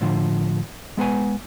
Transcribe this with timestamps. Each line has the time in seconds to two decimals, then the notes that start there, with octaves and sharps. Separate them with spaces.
0.01 A2 D3 F3
0.97 G#3 B3 B4 G#5